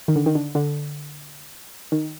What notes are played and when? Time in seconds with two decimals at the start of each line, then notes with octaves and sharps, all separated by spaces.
0.08 D#3
0.16 D3
0.26 D#3
0.35 D3
0.55 D3
1.92 D#3